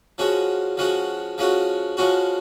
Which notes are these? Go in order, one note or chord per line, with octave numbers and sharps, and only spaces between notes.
F3 G#3 C#4 F#4
F3 G#3 C#4 F#4
F3 G#3 C#4 F#4
F3 G#3 C#4 F#4